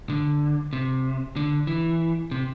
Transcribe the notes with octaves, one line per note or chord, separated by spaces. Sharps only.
D3
C3
D3
E3
C3